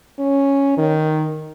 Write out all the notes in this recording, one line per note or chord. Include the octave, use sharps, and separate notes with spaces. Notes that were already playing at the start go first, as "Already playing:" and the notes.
C#4
D#3